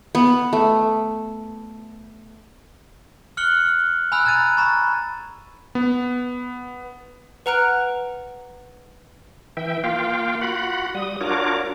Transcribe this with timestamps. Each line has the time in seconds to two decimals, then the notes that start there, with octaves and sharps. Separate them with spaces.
0.15 B3
0.53 A3
3.37 F6 F#6 C#7 F#7 G7
4.12 G#5 B5 E6 F#6
4.25 A#5 F#6 G#6 A6 D#7
4.57 A#5 B5 C#6 A6
5.75 B3
7.46 B4 F#5 A#5 F6 F#6 D7
9.57 E3 E5 G5
9.84 A#3 F4 F5 G5
10.41 F4 F#4 F#5 B5
10.95 G3 D#6
11.21 D4 F4 F#4 A#4 C#5 D6